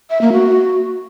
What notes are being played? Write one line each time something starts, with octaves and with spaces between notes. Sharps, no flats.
E5
A#3
F#4